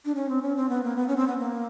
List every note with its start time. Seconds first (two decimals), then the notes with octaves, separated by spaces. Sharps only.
0.05 D4
0.15 C#4
0.29 C4
0.42 C#4
0.56 C4
0.69 B3
0.83 A#3
0.96 B3
1.08 C#4
1.17 C4
1.27 B3
1.38 A#3